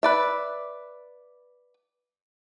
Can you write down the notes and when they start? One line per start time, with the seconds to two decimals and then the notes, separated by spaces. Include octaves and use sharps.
0.03 B4 D5 E5